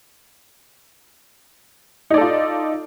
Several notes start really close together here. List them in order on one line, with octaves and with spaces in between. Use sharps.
D#4 D5 A4 F4